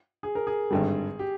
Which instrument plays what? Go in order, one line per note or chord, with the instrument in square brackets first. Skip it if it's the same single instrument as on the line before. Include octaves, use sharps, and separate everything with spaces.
[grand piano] G#4
A#4
G#4
[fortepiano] G#1 G2 D3 G3
[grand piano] G4